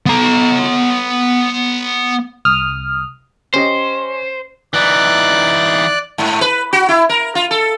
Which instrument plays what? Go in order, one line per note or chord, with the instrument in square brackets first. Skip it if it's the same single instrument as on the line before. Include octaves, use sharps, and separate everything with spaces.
[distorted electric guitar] B3 A#5
[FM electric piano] C2 D#6 F6
[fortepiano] C#4 G4 D#5 [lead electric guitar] C5
[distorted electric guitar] E3 D#4 [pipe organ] D5 F#6
[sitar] G#2
B4
F#4
E4
A#4
F4
A4